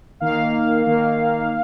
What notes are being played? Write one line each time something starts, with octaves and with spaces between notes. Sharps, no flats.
D#3 A#3 F5
D#3 A#3